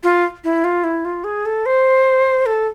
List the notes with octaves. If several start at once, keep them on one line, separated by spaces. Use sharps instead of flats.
F4
E4
F4
E4
F4
G#4
A4
C5
A4